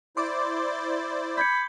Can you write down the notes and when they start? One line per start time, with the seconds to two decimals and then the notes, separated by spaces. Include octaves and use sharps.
0.17 E4 C5 D5 C6 D6
1.37 B5 G6 G#6 C#7